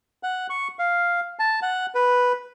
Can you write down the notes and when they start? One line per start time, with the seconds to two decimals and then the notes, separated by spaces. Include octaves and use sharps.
0.23 F#5
0.50 C#6
0.79 F5
1.39 A5
1.62 F#5
1.95 B4